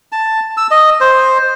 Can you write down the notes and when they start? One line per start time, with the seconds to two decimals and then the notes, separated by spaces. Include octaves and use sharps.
0.12 A5
0.57 E6
0.71 D#5
1.01 C5